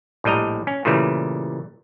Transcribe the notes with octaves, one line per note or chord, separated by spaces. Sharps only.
A#1 A2 G3 D#5 A#5
C#4
A#2 C#3 E3 G3 A3